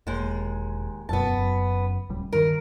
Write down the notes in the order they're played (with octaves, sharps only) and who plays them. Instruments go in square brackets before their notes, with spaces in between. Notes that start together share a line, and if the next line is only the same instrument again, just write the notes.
[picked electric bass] E1 [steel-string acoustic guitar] D#2 G#3
[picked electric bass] F1 F#2 B2 [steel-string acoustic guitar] B3 A5
[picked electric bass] F#1 F#2
D#1 C#2 G3
[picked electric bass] G2 D#3 [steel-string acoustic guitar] A#4